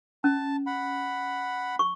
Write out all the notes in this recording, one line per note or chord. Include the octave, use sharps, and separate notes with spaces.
C#4 A5
F#5 B5
C#6